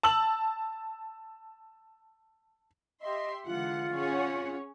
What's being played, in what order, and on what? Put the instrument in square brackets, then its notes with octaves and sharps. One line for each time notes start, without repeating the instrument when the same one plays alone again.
[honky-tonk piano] A5 E6 F#7
[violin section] G4 E5 C6 [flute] D#5
[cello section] D3 E3 G#3 [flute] F4 [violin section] F#5
[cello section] C#4 C#5 [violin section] G#4 F#5